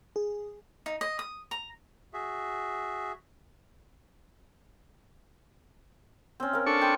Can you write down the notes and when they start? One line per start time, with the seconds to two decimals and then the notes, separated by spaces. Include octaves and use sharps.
0.16 G#4
0.86 D#4
1.01 D#5
1.19 D#6
1.51 A#5
2.13 F#4 G#4 E5
6.40 C4 C#4
6.53 A#4 F5
6.66 D4 A4 C#6
6.82 G5 C6 D#6